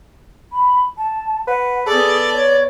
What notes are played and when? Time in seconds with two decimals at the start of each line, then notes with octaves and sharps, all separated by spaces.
0.52 B5
0.98 A5
1.47 B4 F#5
1.87 B3 G#4 A4 D5
2.33 C#5